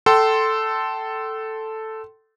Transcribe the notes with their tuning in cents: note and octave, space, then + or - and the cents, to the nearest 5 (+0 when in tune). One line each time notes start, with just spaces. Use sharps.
A4 +0 G5 -35 C6 +0